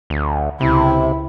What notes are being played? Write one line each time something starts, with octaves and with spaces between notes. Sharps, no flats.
D2
C#2 C3 E4